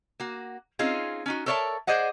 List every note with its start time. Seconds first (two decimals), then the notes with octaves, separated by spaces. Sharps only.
0.20 A#3 F#4
0.79 C4 C#4 D#4 F4 G#4
1.26 C#4 D#4 F#4
1.46 A4 A#4 C#5 D5 E5 A5
1.87 G#4 C5 D5 D#5 F#5